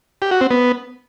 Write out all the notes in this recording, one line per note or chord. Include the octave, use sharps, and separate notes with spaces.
G4
F#4
C4
B3